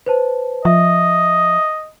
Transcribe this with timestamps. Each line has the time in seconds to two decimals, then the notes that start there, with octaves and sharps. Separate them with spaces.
0.06 B4 C5 A5
0.65 F3 D#5 E5